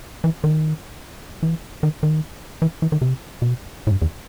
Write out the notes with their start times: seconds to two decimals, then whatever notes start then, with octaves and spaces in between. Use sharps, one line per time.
0.24 E3
0.44 D#3
1.43 E3
1.83 D#3
2.03 D#3
2.62 E3
2.82 E3
2.92 D#3
3.02 C3
3.42 B2
3.87 A2
3.91 G2
4.02 E2